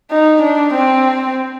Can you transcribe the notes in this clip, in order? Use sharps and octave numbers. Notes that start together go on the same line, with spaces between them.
D#4
D4
C4